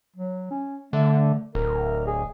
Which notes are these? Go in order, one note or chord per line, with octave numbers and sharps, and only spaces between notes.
F#3
C#4
D3 A3
D1 A#4
G#4